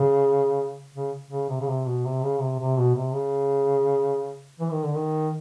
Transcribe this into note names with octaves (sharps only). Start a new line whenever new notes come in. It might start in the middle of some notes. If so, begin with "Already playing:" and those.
Already playing: C#3
C#3
C#3
C3
C#3
C3
B2
C3
C#3
C3
C3
B2
C3
C#3
E3
D#3
D3
D#3